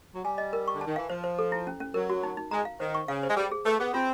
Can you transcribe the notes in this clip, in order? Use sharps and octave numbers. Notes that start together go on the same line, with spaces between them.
F#3
G3 G#5
D#5
A#4
C#6
D3
D#3 A5
E3 F5
F3 C5
C5
A4
E4
C#4
C#4
F#3 A#4
F#4
D#4
D#4
G#3 A#5
F5
D#3 C5
C#6
C#3 F5
C5
G#3
G3 G#4
G#4
A3 B4
B3 G#4
C4 F4